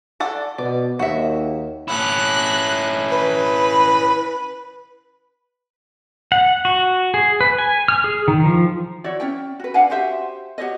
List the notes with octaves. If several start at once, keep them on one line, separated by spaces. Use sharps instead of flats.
A4 D5 F#5
B2 D5
D#2 F#4 E5
C#4 E4 F#6
B4
F#5
F#4
G#4
B4
G#5
F6
G#4
D#3
F3
E4 F#4 C#5 D5
C#4 C#5 G5
F#4 B4
D4 F5 F#5 G#5
F#4 G4 C5 E5
F#4 G4 C#5 D#5